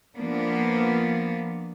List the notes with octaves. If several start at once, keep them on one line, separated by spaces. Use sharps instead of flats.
F3 A#3 B3 D4